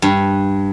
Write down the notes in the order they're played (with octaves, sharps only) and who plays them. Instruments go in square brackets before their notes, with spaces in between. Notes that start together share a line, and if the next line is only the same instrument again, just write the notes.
[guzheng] G2